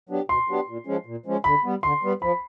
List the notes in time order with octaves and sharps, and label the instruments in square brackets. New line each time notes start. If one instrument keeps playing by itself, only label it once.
[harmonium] F#3 B3 D4 G4
[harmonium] B2 [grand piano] C6
[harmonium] F#3 B3 D4 G4
A#2
F3 G#3 C#4
A#2
F3 G#3 C#4
[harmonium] D3 [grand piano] B5
[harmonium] G3 B3
[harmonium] D3 [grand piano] C6
[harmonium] G3 B3
[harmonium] F3 [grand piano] B5